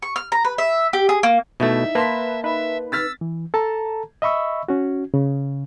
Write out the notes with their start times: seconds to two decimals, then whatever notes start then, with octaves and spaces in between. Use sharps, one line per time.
0.03 C#6
0.16 F6
0.32 A#5
0.45 B4
0.58 E5
0.93 G4
1.09 G#4
1.23 A#3
1.60 B2 A3 D#4 E4 E5
1.95 A#3 B4 A5 C6 B6
2.44 D#4 B4 E5
2.92 E6 F6 A6 B6
3.21 E3
3.54 A4 A5 A#5
4.22 D#5 E5 B5 C#6 E6
4.69 C#4 F#4
5.14 C#3